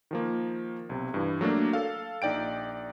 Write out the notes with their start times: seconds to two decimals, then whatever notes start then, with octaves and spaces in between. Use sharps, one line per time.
0.11 D#3 F3 A#3
0.90 B1 C3
1.14 G2 E3
1.41 F#3 A3 A#3 D4
1.73 A4 F5
2.22 A#1 D#4 D5 G5 D7